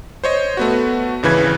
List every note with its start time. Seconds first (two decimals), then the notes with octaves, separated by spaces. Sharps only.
0.24 C5 C#5 D#5
0.57 A3 B3 F#4
1.23 G#1 C#3 E3 B4 G#6